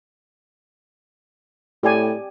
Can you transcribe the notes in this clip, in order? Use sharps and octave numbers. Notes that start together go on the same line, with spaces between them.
A2 G4 D5 G#5